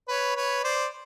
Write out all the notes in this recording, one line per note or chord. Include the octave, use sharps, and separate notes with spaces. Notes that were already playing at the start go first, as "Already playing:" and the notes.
B4 C#5
B4 C#5
C5 D5